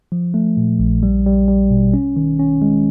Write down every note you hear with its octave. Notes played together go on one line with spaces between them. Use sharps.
F3
A3
A#2
A#1
G3
G3
G3
B2
C#4
D#3
C#4
G#3